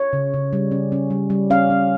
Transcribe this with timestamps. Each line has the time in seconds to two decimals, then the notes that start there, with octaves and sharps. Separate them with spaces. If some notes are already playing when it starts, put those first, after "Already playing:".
Already playing: C#5
0.13 C#3
0.34 C#3
0.53 G3
0.71 C#4
0.92 C#4
1.10 G3
1.30 G3
1.50 C#4 F5
1.70 C#4